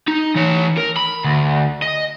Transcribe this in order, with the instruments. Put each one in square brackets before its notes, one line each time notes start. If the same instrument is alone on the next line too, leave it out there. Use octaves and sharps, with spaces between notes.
[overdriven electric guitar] D#4
E3 C#5
A#4
B5
D2
D#5